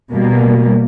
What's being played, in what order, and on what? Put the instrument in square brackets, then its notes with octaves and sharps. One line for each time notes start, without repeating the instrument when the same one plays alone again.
[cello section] B2 G3 A#3